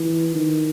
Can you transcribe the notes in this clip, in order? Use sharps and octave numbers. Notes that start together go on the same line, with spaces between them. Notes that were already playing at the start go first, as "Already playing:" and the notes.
Already playing: E3
D#3